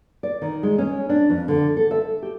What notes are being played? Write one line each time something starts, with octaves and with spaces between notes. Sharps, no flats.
D5
D#3
G#3
C#4
D4
F2
D3
A4
E5
G4